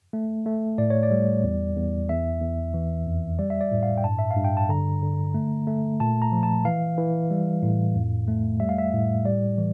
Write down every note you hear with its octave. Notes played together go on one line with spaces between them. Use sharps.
A3
A3
A2 D5
C#5
D5
G3
E2
E2
E2 E5
E2
E3
F2
G3 D5
E5
D5
A2
F5
G5
G2 A5
E5
F5
G2
G5
A5
D3 A#5
D3
A3
A3
A#2 A5
A#5
F3
A5
E3 F5
E3
G3
A2
F2
A3
G3 E5
F5
E5
A2
G3 D5
E3